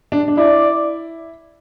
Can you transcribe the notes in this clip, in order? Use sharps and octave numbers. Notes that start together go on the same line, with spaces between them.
D4
D4
E4 D5